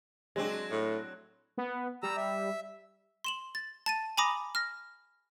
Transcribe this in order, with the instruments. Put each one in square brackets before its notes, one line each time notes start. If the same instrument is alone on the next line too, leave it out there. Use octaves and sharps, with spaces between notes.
[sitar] F#3 C4 D4 [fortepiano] G#3
[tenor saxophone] A2
[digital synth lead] B3
[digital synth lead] G3 [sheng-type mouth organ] A#5 E6
[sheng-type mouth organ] E5
[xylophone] C6 E7 F#7
A6
A5 A6 D#7
G#5 A#5 B5 D6 D#6 A#6
F6 A#6